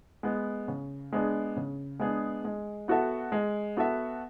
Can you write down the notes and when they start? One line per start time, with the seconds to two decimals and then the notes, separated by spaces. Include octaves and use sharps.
0.23 G#3 B3
0.68 C#3
1.12 G#3 B3 D4 G#4
1.57 C#3
1.99 G#3 B3 D4 G#4
2.44 G#3
2.88 B3 F#4 A4 E5
3.32 G#3
3.77 B3 F#4 A4 E5